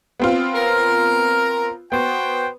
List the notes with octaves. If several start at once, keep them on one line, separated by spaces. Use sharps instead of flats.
B3 C4 F4
A#4
B3 F#4 C5 G5